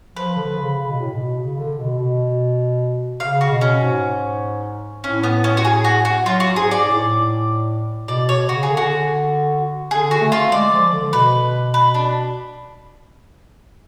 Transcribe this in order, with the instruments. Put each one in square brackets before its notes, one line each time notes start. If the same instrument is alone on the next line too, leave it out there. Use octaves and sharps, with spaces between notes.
[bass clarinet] F3 [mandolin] B4
[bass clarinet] D3
C#3
C#3
B2
A2
B2
C#3
D3
B2
B2
[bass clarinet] C#3 [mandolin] F5
[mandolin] F#4
[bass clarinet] B2
[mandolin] C#4
[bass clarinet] G#2
[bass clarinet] A2 [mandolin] C#4
[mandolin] B3
C#4
F#4
G#4
F#4
F#4
[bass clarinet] F#3 [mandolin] F4
[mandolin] F#4
[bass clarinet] G#2 [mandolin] G#4
[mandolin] D5
[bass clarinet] A2
[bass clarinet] B2 [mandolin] D5
[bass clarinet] B2 [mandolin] C#5
[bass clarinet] C#3 [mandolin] F#4
[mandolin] G#4
[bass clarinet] D3
[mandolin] F#4
[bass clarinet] D3 [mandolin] G#4
[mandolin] F#4
[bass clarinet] A3
[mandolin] F4
[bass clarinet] G#3 [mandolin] D5
[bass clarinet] F3
D3
[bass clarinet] B2 [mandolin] B4
[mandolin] B4
D4